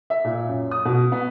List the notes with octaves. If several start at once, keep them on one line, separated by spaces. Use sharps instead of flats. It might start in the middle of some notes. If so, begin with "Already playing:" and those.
E5
A#2
F#2
D#6
B2
B3